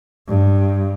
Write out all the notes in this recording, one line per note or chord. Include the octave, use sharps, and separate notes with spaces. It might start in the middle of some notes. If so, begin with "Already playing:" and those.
G2